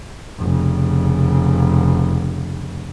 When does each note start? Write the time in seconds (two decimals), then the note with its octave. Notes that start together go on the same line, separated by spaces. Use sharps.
0.39 F1 C#3